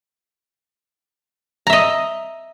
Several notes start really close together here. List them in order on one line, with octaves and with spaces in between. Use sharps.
A#5 E5 D#5